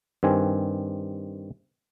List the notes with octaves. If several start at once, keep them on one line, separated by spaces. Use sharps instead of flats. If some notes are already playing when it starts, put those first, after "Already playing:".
G2 D#3 C4 G#5